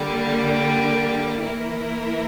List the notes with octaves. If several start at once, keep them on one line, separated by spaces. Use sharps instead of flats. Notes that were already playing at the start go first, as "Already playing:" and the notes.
Already playing: D3 G3 A#3
E3 A#3 E4 A#4